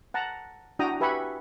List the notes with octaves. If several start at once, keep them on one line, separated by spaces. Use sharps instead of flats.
F#5 A5 A#5
D4 E4 F#4 G5 A#5 D#6
G4 B4 E5 G#5 B5 C#6